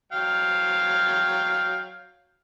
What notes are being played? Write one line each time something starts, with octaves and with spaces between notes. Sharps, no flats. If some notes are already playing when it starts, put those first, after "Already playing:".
F#3 F5 G5